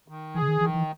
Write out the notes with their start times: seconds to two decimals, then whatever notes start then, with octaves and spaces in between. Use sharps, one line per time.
0.08 D#3
0.35 E3 G#4
0.42 C#3
0.48 D#3
0.61 D#3 E3
0.74 E3